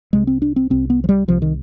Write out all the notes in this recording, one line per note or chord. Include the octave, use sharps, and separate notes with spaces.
C2 C3 G#3
C4
D4
C4
C2 C3 C4
B3
F3
G3
C2 C3 F3
D#3